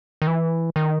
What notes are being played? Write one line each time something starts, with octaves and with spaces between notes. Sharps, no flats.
D#3
E3
D#3